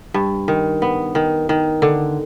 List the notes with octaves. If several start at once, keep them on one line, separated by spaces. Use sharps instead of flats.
G2
D#3
B3
D#3
D#3
D3